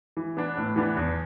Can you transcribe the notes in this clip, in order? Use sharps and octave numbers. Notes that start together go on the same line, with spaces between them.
E3
B3 D4
A2
E3 B3 D4
E2